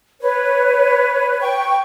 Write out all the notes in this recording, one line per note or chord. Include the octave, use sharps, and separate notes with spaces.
B4 C#5
G5 C#6